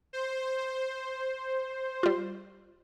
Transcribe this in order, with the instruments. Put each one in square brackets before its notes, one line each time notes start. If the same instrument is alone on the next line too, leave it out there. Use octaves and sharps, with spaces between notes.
[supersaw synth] C5
[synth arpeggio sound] G3 F4